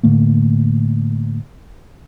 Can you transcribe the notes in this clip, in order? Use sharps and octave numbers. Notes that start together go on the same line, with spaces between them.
A2 D3 A3 A#3